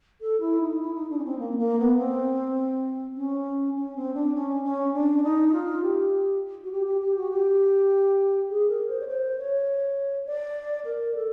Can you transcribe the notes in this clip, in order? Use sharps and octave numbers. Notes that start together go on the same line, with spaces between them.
A4
E4
D#4
E4
D#4
D4
C#4
C4
A#3
A#3
B3
C4
C#4
C#4
C4
D4
C#4
C#4
D4
D#4
F4
G4
F#4
G4
G4
G4
F#4
G4
G#4
A#4
C5
C#5
C5
C#5
D5
A#4
A4